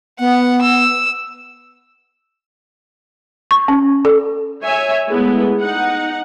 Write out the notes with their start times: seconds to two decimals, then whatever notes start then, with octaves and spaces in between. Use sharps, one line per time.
0.19 B3 F#5
0.62 E6
3.51 C#6
3.68 C#4
4.05 A4
4.63 C#5 E5 G#5
5.08 G#3 A3 B3 E4
5.61 D#4 F#5